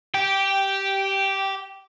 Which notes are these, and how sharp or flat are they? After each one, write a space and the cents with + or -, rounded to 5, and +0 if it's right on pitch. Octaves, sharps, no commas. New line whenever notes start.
G4 -10 G5 +0